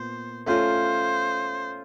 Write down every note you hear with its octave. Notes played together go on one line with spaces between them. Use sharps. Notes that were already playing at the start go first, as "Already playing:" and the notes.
Already playing: A#2 B3 C5
A3 C#4 F4 A4 C5